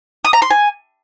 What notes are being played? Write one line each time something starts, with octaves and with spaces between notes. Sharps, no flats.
D#6
A#5
C6
G#5